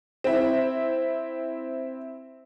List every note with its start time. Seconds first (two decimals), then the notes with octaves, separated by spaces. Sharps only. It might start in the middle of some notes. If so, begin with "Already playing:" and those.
0.24 C4 E4